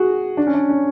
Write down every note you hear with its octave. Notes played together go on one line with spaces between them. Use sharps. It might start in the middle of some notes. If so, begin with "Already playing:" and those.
Already playing: F#4 G#4
D4
C#4
D4
C#4